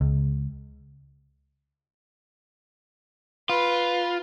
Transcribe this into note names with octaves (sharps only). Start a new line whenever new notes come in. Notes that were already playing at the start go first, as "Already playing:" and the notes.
C#2
F4 B4